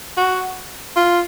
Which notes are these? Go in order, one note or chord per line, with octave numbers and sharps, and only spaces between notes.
F#4
F4